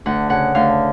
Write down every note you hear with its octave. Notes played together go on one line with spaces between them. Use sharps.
D2 F#5
C#3 F#5
D2 F5